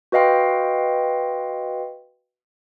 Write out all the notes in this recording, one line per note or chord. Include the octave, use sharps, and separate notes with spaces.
F#4 B4 D#5 F5 G5 C6